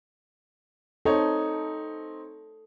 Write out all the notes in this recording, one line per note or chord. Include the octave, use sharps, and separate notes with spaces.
C4 D#4 A4 C#5